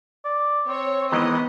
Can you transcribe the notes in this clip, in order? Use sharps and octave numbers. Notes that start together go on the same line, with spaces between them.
D5
C4 C#5
D#3 E3 G#3 B3 D#5